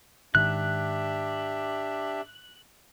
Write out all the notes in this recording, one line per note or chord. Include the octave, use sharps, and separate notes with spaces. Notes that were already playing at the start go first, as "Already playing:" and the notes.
G#2 D#3 D4 G4 E5 F#6